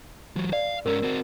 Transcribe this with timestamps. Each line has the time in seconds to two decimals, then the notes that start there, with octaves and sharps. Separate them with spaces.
0.36 E3 F#3
0.53 D5 F5
0.86 G#2 C#4 A#4
1.03 C4 F#4